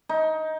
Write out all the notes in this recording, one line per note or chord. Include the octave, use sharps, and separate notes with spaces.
D#4